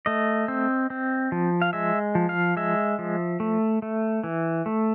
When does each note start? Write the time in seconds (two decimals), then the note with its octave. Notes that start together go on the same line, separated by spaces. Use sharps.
0.06 A3 D#5
0.48 C4
0.90 C4
1.32 F3
1.62 F5
1.73 G#3 E5
2.15 F3
2.29 F5
2.57 G#3 E5
2.99 F3
3.40 A3
3.82 A3
4.24 E3
4.66 A3